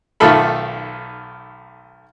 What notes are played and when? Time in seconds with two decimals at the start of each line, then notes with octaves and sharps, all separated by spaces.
0.20 B1 D#3 A3 F4 A4 B5